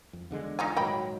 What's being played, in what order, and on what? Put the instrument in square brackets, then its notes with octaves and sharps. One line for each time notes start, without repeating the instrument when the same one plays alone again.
[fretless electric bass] F2
E2 D3 G#3
[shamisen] D#4 F4 G#5
[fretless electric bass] D#1 G#2 F#3 [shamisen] D#5 G5 B5